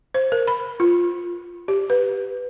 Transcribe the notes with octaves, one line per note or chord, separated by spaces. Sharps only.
C5
A#4
B5
F4
G4
B4